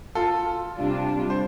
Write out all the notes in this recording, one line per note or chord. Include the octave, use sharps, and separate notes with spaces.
F4 A4
C3 G3 D4 F4
C5